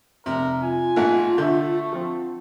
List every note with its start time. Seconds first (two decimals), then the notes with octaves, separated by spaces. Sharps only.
0.26 F1 C3 A#4
0.62 F4 G#5
0.96 G#1 A#2 A3 F#5
1.38 D3 A3 E5 G6
1.93 F3 C4